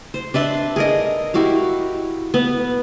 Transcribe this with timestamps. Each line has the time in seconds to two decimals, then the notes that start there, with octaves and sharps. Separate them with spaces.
0.14 C5
0.34 D4 B4 E5 C6
0.76 G#4 A#4 D#5
1.34 E4 F#4 G4 F5
2.34 B3